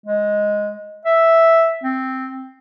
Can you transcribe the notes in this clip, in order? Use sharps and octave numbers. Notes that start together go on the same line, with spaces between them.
G#3
E5
C4